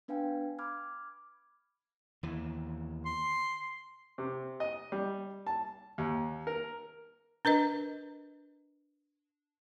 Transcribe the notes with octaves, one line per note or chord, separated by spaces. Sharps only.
B3 D4 B4 F5 G5 G#5
B5 D6 F6 G#6
D#2 E3
C6
C3
D#5
G3
A5
D#2
A#4
D4 A#4 B4 D#5